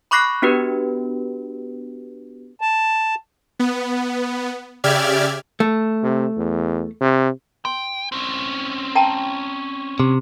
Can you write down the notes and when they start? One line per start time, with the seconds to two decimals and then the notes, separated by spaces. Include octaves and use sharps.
0.11 B5 C#6 D6 F#6 A#6 C7
0.42 B3 D4 F#4 G4 B4
2.61 A5
3.60 B3
4.84 C#3 G4 D5 E5 F6 G#6
5.60 A3
6.03 C3
6.37 E2
7.01 C3
7.65 G5 C6
8.12 C4 C#4
8.95 G5 A5 A#5
10.00 C3